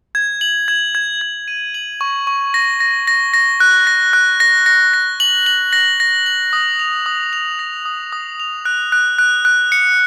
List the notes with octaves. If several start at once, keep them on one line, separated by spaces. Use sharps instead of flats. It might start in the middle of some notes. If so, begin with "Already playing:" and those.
G#6
F#7
G#6
G#6
G#6
D#7
F#7
C#6
C#6
A#6
A#6
A#6
A#6
F#6
A#6
F#6
A#6
A#6
A#6
F#7
F#7
A#6
A#6
F#7
D#6
F7
D#6
F7
A#6
D#6
D#6
F7
F#6
F#6
F#6
F#6
C#7